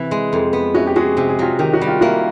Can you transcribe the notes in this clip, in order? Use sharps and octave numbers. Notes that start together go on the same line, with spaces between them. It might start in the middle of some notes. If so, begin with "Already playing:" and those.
Already playing: C3 E3
G#3
F2
B3
C#4 E4 F#4
G4
G#3 F#4 G#4
C3 G4
G#4
F#3 F4 G4
D#3 G4
F#4
G3
F4
A#3 E4 F#4